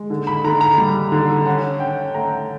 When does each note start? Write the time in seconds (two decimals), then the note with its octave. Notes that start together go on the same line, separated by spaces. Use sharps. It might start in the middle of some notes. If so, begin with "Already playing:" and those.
Already playing: G#3
0.10 D3
0.27 B5
0.44 D3 A#5
0.61 A#5
0.78 G3
1.12 D3
1.46 C#4 F#5
1.80 C#4 G5
2.14 A3 A#5